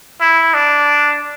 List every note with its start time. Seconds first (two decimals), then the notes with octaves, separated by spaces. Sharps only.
0.21 E4
0.54 D4